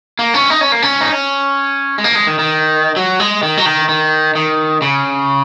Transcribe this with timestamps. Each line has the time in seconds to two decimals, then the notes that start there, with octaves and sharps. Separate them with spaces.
0.19 A#3
0.34 C#4
0.50 D#4
0.61 C#4
0.72 A#3
0.82 C#4
1.01 D#4
1.12 C#4
1.98 G#3
2.04 A#3
2.15 G#3
2.27 D#3
2.39 D#3
2.96 F#3
3.20 G#3
3.43 D#3
3.57 F#3
3.66 D#3
3.89 D#3
4.35 D#3
4.82 C#3